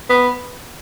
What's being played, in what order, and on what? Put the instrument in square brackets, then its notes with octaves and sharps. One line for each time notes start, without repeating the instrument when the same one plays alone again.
[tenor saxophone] B3